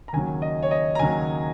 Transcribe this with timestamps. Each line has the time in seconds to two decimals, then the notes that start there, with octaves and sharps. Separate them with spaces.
0.08 A#5
0.13 D#2 C#3 F#3 G#5
0.42 D#5
0.63 C#5
0.71 D#5
0.95 A#5
0.99 D#2 C#3 F#3 G#5